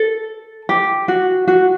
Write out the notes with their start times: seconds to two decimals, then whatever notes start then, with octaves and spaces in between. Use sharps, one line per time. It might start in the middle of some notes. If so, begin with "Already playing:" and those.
Already playing: A4
0.69 G4
1.08 F#4
1.48 F#4